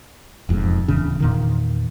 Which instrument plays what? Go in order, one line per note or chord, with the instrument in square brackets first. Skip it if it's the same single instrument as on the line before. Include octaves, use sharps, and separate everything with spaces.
[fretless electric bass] E1 F2 G#2
D1 E2 C#3 D4
E2 A#2 D#3